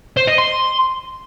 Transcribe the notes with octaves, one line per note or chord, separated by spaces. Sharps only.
C5
D#5
C6